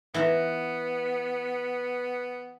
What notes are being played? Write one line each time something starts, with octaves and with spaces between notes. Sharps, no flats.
E3 B3 E5 A#5